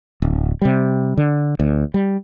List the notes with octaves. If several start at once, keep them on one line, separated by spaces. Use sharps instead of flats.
D1
C3 G3
D3
D2
G3